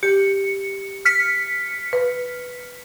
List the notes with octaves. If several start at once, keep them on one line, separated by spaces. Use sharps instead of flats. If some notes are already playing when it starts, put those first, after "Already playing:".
G4 C#7
F6 B6 C#7
B4